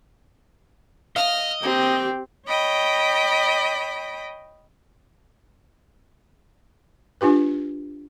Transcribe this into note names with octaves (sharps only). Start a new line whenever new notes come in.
D#5 F5 F6
A#3 C4 G4
C#5 D#5 G5 B5
D4 F4 G4 B4